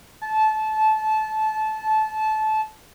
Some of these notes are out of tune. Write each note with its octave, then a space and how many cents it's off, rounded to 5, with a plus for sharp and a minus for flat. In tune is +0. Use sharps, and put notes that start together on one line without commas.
A5 -20